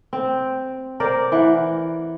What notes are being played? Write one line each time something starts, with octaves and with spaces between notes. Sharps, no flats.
C4
A#4 C5 D5
E3 F#5